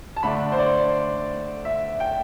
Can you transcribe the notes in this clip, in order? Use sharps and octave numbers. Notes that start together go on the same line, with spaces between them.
A5
D3 A3 D4 B5
C5
D5
E5
G5